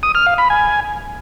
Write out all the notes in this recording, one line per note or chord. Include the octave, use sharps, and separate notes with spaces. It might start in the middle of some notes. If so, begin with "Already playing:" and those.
D#6
F6
F5
B5
G#5